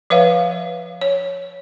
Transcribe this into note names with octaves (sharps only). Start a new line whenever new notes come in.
F3 B4 C#5 E5 F5
C#5